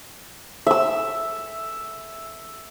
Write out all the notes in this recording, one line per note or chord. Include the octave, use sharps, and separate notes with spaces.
E5 E6